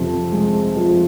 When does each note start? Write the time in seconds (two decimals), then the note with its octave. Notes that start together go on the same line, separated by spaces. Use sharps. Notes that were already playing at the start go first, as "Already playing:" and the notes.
Already playing: F2 C3 F3
0.32 G#3
0.76 F3